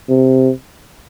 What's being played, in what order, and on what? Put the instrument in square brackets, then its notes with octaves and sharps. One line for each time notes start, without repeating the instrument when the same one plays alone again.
[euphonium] C3